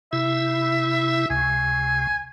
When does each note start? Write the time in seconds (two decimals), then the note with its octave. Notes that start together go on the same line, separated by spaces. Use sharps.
0.13 C3 E4 E5
1.30 C#2 C3 G#5